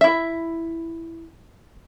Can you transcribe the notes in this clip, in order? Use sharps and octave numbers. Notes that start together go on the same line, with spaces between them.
E4 E5